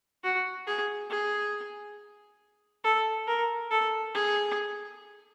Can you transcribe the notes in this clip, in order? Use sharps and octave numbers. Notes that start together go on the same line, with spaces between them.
F#4
G#4
G#4
A4
A#4
A4
G#4